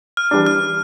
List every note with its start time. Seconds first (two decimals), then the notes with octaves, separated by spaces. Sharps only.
0.17 F6
0.31 E3 G3 D4
0.46 F6